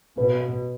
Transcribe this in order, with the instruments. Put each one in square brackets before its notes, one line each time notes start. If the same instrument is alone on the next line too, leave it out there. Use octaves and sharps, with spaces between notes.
[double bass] B2 [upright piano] B4